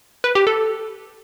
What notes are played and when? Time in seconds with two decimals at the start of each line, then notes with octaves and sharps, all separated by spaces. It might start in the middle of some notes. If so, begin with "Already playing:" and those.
0.24 B4
0.35 G4
0.47 A4